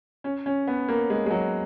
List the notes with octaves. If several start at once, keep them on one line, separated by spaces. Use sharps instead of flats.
C#4
C#4
B3
A#3
G#3
G#3
F#3